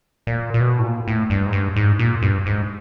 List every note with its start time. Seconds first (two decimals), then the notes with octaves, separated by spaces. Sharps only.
0.27 A#2
0.54 A#2
0.60 B2
0.79 A2
0.84 A#2
1.08 A2
1.30 G2
1.46 G#2
1.53 G2
1.76 G#2
1.99 A#2
2.22 G2
2.46 G#2